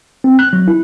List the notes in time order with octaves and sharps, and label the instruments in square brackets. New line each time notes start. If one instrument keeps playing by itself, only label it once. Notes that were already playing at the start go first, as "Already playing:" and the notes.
[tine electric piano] C4
F#6
F#3
E4